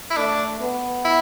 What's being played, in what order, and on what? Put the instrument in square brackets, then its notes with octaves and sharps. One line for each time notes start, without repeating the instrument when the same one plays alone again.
[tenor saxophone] E4
[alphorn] A3 [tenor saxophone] D4
[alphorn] B3
[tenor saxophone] E4